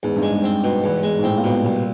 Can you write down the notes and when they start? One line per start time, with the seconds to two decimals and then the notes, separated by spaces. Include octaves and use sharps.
0.03 E2 G#2
0.16 G2
0.23 G#3
0.30 G#2
0.44 C4
0.64 B2
0.84 E2
1.03 G#3
1.19 G#2
1.23 A2 C4
1.37 A#2
1.44 B2
1.51 A#2
1.65 C2